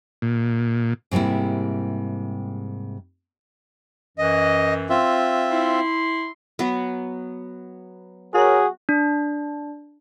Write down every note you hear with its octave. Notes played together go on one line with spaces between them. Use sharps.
A#2
G#2 C3 G3 A#3 E4
F#2 E3 D#5
C4 F4 E5
E4 C6
F#3 B3
F#4 G#4 A#4 C#5
D4